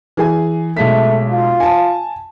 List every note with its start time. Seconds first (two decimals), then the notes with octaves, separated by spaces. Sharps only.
0.17 E3 G#4 G#5
0.77 B1 G#3 A3 B6
1.30 F4
1.60 G#5 A5